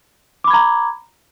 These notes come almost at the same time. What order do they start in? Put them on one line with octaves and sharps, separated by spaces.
D6 B5 G#6 A#5